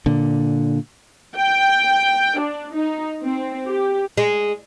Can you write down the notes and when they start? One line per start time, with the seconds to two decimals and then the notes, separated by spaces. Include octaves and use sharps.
0.06 A#2 D3
1.37 G5
2.40 D4
2.74 D#4
3.23 C4
3.67 G4
4.17 G#3